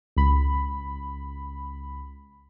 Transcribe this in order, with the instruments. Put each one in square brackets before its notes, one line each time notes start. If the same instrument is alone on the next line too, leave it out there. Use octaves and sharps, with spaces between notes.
[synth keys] C#2 B5